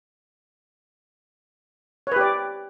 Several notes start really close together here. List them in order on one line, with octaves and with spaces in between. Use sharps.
C#5 B4 G4 D5